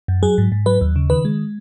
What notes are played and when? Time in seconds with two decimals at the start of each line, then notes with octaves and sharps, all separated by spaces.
0.08 F#2
0.23 F#3 G#4
0.38 G#2
0.52 G#2
0.66 F#3 B4
0.81 D#2
0.96 C#3
1.10 D#3 B4
1.25 G#3